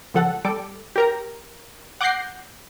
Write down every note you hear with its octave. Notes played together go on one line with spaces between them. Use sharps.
C#2 F3 A4 F#5
G3 A4 D6
G4 A#4 A#5
F#5 D6 F#6 G6 A#6 C7